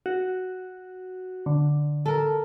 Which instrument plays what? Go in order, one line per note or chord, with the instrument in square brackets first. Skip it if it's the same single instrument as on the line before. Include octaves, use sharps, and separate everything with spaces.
[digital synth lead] F#4
D3
[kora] A4 A#4